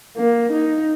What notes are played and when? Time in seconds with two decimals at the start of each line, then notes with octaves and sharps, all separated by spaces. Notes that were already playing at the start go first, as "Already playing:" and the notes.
0.17 A#3
0.52 D#4